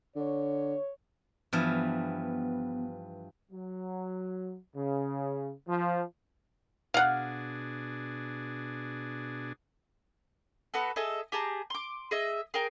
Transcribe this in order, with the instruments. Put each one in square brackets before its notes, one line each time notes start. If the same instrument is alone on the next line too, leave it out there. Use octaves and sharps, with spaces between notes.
[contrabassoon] D3 [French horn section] C#5
[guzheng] G2 E3 F3 [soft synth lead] B3
[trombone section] F#3
C#3
F3
[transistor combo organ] B2 D4 G#4 [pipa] F5 F#5
[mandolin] B3 F#4 A4
G#4 A4 D#5 E5
G4 G#4 A5 A#5
C6 D6
G#4 D#5 E5
G#4 A#4 G5